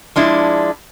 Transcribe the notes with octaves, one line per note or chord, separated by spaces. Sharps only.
F3 G#3 D4 E4